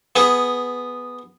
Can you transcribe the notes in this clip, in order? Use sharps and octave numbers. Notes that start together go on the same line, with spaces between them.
B3 G#4